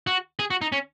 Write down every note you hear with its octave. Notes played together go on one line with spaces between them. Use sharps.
F#4
G#4
F#4
D#4
C#4